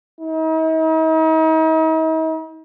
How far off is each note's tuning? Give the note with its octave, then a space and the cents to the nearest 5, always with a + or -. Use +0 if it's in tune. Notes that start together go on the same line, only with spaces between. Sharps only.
D#4 +45